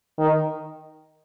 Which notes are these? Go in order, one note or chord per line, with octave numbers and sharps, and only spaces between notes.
D#3